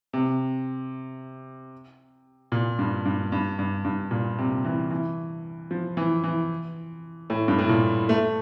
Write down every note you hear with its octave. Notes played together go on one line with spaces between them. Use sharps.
C3
A#2
G2
G2
G2
G2
G2
A#2
C3
E3
E3
F3
E3
E3
A2
G2
A2
A#2
A3